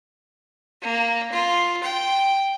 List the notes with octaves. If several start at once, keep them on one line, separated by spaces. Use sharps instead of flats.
A#3
F4
G5